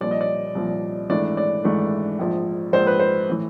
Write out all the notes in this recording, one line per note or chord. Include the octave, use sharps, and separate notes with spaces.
C2 A#2 F3 D5
D#5
D5
C2 A#2 F3
G#1 G#2 E3 A3 D4 D5
D5
G#1 G#2 E3 A3 D4
A#1 G#2 F3
A#1 G#2 F3 C5
B4
C5
A2 E3